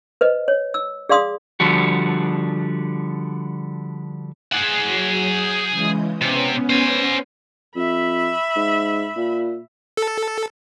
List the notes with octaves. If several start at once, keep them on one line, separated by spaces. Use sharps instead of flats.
B4 C5 D#5
C#5
E6
G#4 D5 F5 C6 D#6
D3 F3 G3 F#4
G#4 F#5
F#3
D#6 G6
C#3 E3 G#3
C3 B3 C#4
C5 G#5
F2 E5 B5
G#2
A#2
A4